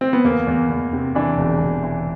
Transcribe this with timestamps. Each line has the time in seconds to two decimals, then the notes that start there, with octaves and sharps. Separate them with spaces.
0.01 C4
0.13 B3
0.24 E2 A#3
0.47 E2
0.70 E2
0.93 C3
1.15 E3 D4
1.38 E1
1.60 E1
1.83 E3